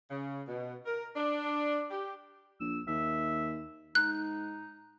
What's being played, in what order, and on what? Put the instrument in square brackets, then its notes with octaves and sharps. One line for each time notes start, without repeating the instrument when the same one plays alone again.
[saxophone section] C#3
B2
A#4
D4
G4
[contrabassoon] A#1 [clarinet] E6
[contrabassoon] D#2 [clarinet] E5
[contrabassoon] G#2 [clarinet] D#4 [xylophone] F#6